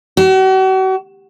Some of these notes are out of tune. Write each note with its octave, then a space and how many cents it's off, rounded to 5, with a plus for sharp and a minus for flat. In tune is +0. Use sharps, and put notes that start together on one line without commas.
F#4 +40